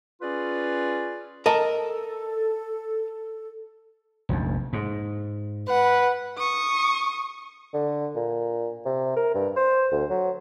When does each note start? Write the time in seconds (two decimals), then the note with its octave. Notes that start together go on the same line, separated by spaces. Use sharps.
0.22 C#4 F4 G#4 B4 D5
1.46 A4 A#4 D#5 A5
4.29 F1 A#1 F2
4.73 G#2
5.68 B4 F#5
6.37 C#6 D#6
7.74 D3
8.15 A#2
8.85 C3
9.16 A#4
9.35 G2
9.56 C5
9.92 D2
10.10 F#3